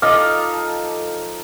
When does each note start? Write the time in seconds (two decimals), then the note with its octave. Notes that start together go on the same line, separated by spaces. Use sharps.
0.02 F3 D#4 A4 F5 D6